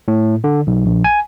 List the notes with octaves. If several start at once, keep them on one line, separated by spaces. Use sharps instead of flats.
A2
D3
B1
A#1
G#5